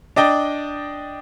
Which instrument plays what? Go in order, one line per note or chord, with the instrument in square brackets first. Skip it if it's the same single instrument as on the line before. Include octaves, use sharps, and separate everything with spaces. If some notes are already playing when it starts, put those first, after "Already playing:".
[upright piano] D4 D5 D#5 G5